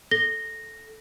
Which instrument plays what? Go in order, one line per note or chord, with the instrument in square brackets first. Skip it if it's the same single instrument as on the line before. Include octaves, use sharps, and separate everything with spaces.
[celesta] A4 A#6 G7